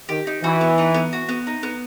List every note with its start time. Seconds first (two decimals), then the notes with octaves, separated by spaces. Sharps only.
0.09 D#3 G4
0.27 D#4
0.43 E3 F#4
0.61 B3
0.78 D#4
0.94 B3
1.13 F#4
1.29 B3
1.47 D#4
1.63 B3